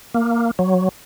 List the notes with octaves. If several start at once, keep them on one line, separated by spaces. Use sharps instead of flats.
A#3
F#3